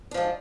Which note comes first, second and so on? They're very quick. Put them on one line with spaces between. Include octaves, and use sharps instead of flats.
D4 F3 G#2